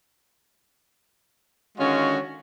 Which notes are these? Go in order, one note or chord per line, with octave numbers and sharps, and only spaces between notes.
D3 D#3 G#3 C#4 F4 F#4